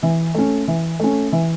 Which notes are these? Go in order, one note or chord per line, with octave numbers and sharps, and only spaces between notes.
E3
A3 C#4
E3
A3 C#4
E3